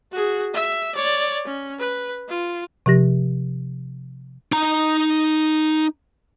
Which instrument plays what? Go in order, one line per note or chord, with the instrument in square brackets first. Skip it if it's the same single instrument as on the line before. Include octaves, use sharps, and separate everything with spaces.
[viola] F#4 G#4
E5
C#5 D5
C#4
B4
F4
[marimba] C3 F3 G4 A#6
[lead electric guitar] D#4 A#5